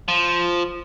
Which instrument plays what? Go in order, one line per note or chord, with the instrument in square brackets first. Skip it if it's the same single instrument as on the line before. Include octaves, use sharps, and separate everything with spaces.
[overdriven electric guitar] F3